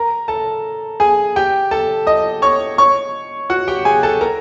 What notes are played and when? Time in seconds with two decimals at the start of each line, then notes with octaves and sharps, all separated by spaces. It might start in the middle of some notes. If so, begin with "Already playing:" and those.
Already playing: A#4 A#5
0.28 A4 A5
1.00 G#4 G#5
1.36 G4 G5
1.71 A4 A5
2.07 D#5 D#6
2.42 C#5 C#6
2.78 C#5 C#6
3.50 F#4 F#5
3.68 G4 G5
3.85 G#4 G#5
4.03 A4 A5
4.21 A#4 A#5